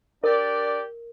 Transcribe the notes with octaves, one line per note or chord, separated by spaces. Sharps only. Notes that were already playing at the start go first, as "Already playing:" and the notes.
D4 G4 A#4 D5